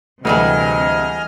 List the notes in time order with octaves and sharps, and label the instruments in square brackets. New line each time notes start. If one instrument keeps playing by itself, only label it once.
[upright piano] D2 [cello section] C3 [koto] E3 G3 G#3 [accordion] D#5 G#5 F6